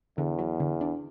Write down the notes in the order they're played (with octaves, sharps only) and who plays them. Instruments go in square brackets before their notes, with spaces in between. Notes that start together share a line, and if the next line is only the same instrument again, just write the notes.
[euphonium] E2 [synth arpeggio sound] D3
[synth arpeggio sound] F#3
D3
D4